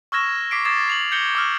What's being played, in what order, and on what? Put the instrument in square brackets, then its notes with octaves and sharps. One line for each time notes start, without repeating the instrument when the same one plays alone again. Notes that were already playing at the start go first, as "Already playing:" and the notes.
[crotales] C#6 E6 F6 G#6 A#6 E7
D6 B6 C7 D7
D6 D#6 G#6 A6 C7 E7
C7 F7 F#7
G6 G#6 A#6 C#7 G7
D6 E6 F6